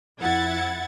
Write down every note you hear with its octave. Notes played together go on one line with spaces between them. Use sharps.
F2 E4 F#5 G#6 A6